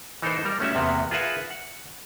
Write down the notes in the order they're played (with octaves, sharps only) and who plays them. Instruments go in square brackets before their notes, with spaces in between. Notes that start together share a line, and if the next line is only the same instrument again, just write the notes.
[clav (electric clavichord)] E3 D#4 A4 A#4 C5
G3 A#4
A3 C#4 F#4 G4 E5
E2 C3 A#3 B3 F#5
F4 G#4 A#4 B4 E5 F#5
F#5